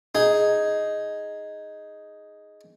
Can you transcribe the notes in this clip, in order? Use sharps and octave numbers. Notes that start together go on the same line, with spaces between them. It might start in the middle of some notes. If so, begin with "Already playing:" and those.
D#4 G#4